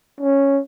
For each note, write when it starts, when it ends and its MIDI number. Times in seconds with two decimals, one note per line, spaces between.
0.21 0.60 61